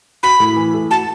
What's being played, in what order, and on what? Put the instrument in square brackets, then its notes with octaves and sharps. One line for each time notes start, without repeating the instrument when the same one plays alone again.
[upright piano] F#4 [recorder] B5
[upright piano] A2
E3
A3
[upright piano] F#4 [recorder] A5